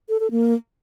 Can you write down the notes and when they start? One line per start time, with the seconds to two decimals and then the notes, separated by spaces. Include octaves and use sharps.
0.09 A4
0.20 A4
0.31 A#3